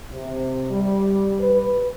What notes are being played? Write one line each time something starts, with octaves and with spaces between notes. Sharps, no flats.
C3
G3
B4